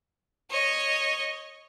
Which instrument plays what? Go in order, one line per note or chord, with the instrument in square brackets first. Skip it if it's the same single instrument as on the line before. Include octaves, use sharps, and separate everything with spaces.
[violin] C#5 D#5